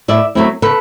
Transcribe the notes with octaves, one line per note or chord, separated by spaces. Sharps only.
A2 D5 E5
F#3 A3 C4 E4
C#3 A4 B4